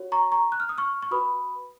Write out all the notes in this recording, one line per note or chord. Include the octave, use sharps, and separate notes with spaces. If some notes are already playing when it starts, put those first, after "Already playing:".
Already playing: F#4 C#5
A#5 C#6
A#5 C#6
F#6
F6
D#6
C#6 F6
C#6
F#4 B4 B5 D#6